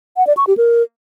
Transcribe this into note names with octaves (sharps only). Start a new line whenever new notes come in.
F#5
D5
C#6
G4
A#4